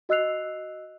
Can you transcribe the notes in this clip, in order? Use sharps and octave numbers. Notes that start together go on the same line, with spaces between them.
F#4 D#5 E6 F#6 C7 F7